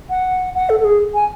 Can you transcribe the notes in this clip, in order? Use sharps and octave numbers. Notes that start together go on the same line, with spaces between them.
F#5
F#5
A4
A4
G#4
G#5